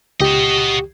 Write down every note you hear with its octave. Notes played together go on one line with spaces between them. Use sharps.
C#2 F#4 G4 D#5